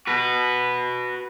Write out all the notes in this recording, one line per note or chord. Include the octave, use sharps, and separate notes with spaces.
F#4 B4